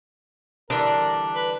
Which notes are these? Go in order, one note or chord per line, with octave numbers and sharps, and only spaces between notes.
D3 E3 G3 D4 A#4
B4